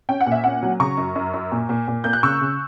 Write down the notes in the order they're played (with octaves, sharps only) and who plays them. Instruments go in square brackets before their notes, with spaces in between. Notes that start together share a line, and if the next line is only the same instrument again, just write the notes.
[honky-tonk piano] C#4 G5
F#5
A#2
E5
C#4 F#5
F#3
C#3 A#5 C#6
F#2
F#2
F#2
A#2
A#2
A#2
A#3 G6
F#6
C#3 C#6 E6
C#3